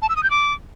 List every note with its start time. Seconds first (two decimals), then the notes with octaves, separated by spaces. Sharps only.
0.02 A5
0.09 E6
0.16 D#6
0.23 G6
0.30 D6